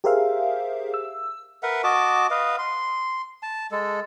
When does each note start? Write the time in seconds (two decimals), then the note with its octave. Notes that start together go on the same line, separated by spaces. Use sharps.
0.04 G4 G#4 A#4 C5 E5 F5
0.94 E6
1.63 A#4 B4 E5 F#5
1.84 F#4 D#5 A5 D6
2.31 B4 D#5 F5
2.59 C6
3.43 A5
3.71 G#3 A4